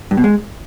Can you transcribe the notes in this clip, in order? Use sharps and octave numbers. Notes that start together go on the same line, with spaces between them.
G2
B2
G#3